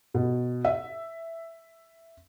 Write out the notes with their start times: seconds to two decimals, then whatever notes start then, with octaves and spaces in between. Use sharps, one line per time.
0.14 B2
0.65 E5